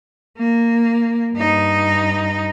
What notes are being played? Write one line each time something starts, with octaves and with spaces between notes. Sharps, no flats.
A#3
G2 D#4